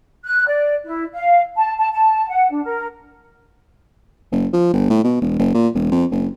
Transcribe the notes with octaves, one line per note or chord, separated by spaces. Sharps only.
F#6
D5
E4
F5
A5
A5
A5
F#5
D4
A#4
F#1
F3
G1
A2
B2
E1
F#1
A#2
E1
F2
F#1